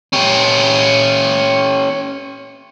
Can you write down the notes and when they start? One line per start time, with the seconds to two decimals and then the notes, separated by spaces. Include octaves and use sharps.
0.13 C#4 G4